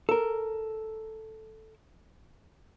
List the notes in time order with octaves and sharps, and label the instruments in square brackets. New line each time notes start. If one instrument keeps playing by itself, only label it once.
[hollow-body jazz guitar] A4 A#4